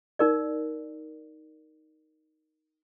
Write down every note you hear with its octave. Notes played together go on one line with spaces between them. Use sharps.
D#4 A#4 D5